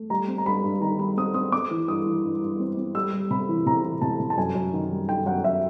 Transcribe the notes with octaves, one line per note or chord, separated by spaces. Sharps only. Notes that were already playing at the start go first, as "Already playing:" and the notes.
Already playing: A3
G3 A#5
C4
A#5
G2 B5
G2
D#3 A#5
G3 B5
C4 D#6
C4 D#6
C4 D6
E3
G2 D#6
E3
G2
G2
C4
C4
G3 E6
G3
C3 B5
E3
C3 A#5
E3
C3 A5
C3
A5
F#2 G#5
F#2
D#3
G3
D#3 G5
F#2 F#5
F#2 E5